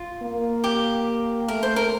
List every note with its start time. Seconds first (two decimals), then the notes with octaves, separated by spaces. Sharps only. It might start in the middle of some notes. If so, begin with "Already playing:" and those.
Already playing: F4
0.22 A#3
0.64 G4
1.48 A3 A#4
1.63 C5
1.76 A#4